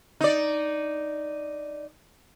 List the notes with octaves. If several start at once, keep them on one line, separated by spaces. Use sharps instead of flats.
D#4 D5